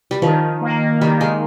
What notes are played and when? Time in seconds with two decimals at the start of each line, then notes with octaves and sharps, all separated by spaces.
0.11 G3
0.22 D#3 F3
0.61 A#3
1.01 D#3 G3
1.21 G#3